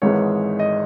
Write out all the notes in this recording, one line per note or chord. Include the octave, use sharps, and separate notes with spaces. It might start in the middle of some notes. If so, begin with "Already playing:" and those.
G#1 G#2 E3 G#3 C#5
D#5